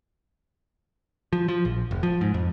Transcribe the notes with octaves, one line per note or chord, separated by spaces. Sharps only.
F3
F3
A#1
F1
F3
G#2
F2